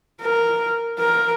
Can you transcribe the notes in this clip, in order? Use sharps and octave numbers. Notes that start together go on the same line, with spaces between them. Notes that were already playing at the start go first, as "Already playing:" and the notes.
A#4
A#4